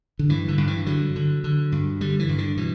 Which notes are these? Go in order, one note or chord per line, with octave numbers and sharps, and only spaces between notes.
D3
G2 E3
D3
G2
E3
D3 F#3
D3
D3
G2
D3 G3
E3
G2
D3
B2 E3